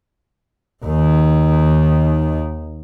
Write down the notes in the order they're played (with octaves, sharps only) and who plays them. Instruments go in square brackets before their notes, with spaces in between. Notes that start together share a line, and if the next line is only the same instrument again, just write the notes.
[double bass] D#2 D#3